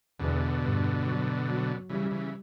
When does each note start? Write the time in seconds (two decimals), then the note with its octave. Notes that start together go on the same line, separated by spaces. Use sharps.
0.20 E2 B2 D3
0.63 G2
1.05 F#3
1.48 F#3
1.89 C#3 E3 G3
2.11 C#3 E3